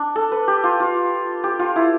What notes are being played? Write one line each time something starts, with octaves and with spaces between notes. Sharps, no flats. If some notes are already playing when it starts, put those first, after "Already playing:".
Already playing: D4
A4
B4
G4
F4
F4
G4
F4
E4